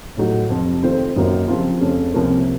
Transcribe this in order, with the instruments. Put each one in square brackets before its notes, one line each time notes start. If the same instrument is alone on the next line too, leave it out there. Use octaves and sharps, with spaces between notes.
[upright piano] A2 F#3 A3 D#4 F#4
F2 C3 F3
D#3 A3 C4 F4 C5
F#2 D#3 F#3 A#3 D#4
C#3 F3 C4 F4
F2 C#3 A3 C#4
C2 C3 F3 A#3 C#4